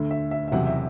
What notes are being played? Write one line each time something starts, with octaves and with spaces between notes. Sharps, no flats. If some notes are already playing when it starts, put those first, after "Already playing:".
Already playing: D2 D3 A3
E5
E5
E5
F#1 E2 C3 F#3 F#5
E5